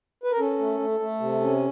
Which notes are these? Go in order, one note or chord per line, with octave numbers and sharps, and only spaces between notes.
B4
A#4
C#4 A4
A3
A3
A3
C3
C#4